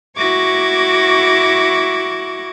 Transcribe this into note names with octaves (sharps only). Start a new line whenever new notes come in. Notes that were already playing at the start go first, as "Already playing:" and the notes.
E4 F#4 C#6 D6 G#6 A#6